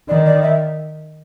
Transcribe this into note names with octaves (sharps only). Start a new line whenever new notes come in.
D#3 D5
D5
E5